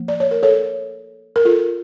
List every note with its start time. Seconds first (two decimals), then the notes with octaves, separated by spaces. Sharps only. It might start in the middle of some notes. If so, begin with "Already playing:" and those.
Already playing: F3 A#3
0.08 D5
0.20 C#5
0.31 A#4
0.43 A4 C#5
1.36 A#4
1.45 F4 A4